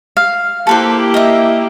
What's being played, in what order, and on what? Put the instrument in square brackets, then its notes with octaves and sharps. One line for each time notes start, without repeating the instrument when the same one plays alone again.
[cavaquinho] F5
[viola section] A#3 E4 G4 [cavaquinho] A4 B4 C5
[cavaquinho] D#5 E5